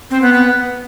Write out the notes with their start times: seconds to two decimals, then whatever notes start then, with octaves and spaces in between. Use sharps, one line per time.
0.10 C4
0.22 B3
0.33 B3